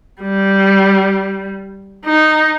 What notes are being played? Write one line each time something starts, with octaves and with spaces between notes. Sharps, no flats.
G3
D#4